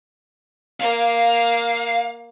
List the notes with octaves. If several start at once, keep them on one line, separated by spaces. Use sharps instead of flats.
A#3 F5